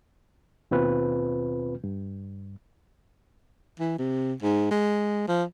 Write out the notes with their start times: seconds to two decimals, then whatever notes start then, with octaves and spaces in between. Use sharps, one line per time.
0.71 D#2 B2 C4 F4 B4
1.84 G2
3.80 E3
3.99 C3
4.42 G#2
4.71 G#3
5.28 F3